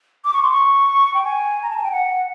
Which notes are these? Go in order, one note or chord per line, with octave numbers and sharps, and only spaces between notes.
D6
C#6
C6
C#6
G5
G#5
A#5
A5
G#5
G5
F#5